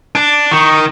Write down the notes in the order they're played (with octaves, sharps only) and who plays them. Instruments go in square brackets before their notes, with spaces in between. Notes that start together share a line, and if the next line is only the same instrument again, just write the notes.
[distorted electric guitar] D4
[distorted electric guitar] D#3 [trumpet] C#6